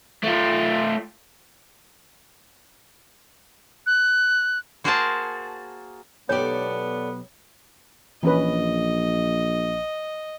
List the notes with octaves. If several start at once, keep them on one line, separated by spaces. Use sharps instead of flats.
A3 F4
F#6
A#3 F#4 G#4 A#4 C5 A5
B1 B3 G4 A4 C#5 D5
A#1 E3 C#4 B4 D#5